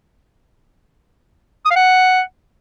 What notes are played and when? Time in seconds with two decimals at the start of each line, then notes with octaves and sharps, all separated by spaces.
1.65 D#6
1.71 F5
1.76 F#5